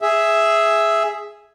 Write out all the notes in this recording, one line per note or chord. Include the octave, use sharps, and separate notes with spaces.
G#4 E5